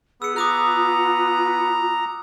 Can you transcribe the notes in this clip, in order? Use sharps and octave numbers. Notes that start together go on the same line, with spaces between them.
B3 G#4 E6 C#7
F4 A#5 D6 D#6 F#6